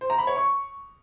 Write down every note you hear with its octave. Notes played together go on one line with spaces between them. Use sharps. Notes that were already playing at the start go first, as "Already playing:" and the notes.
C5
A#5
B5
C#5
C#6